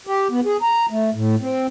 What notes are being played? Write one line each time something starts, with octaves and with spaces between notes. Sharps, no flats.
G4
B3
G#4
A#5
A3
A2
C4